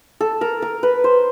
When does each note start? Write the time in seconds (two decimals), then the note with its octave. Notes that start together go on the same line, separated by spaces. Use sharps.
0.21 A4
0.41 A#4
0.62 A#4
0.83 B4
1.04 C5